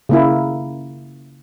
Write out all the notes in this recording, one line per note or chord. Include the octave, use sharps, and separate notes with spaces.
C#3 A#3 E4